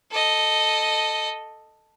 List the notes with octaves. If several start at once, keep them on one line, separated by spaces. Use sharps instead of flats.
A4 D#5